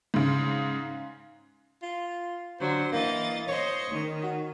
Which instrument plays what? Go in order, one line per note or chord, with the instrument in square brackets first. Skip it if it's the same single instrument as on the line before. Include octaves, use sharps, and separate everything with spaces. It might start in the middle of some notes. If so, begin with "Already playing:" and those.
[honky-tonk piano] G#2 C#3
[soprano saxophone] F4
[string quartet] D3 F#3 [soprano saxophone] C5
[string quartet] E3 D#5 A6 [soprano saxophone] A#3
[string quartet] C5 D#5 [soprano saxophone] C#5
[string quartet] D#3
[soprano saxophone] F#4